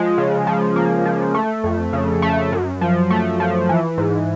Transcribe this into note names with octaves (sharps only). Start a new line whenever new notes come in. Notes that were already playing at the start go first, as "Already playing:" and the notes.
Already playing: F3 G#3
C#3
F3
A#3
F3
A3
F2
C#3
A3
F#2
F3
A3
F3
E3
G#2